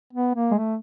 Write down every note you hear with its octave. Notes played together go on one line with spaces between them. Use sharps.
B3
A#3
G#3
A3